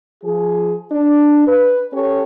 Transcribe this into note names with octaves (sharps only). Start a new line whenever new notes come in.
F3 G#4
D4
B4
C#4 G4 A4 C#5